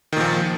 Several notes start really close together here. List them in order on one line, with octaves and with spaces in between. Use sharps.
D#3 A#2 F3